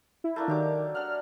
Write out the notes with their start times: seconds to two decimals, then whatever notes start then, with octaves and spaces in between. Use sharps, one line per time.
0.24 E4
0.36 A3 A#3 D4
0.48 D#3 F#3 G4 D6
0.95 D4 F#5 F6